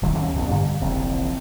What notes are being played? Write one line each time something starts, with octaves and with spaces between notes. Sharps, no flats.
D1 C2 D#3 E3
D#2 C#4
B1 F2 A3 B3
G2 D3
E1 A#1 C#3 C4